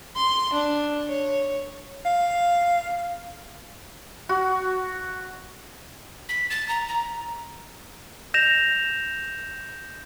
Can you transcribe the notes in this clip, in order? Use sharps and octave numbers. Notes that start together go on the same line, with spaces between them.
C6
D4
C#5
F5
F#4
B6
A6
A#5
A#5
G6 A#6 E7 F7